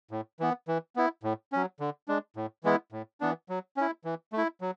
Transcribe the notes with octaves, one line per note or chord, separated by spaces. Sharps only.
A2
E3 B3
E3
B3 E4
A2
F#3 C#4
D3
G#3 D4
A2
E3 G#3 B3 E4
A2
E3 B3 D4
F#3
C#4 E4
E3
A3
E4
F#3